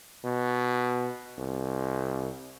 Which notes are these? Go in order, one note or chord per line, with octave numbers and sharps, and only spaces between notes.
B2
C2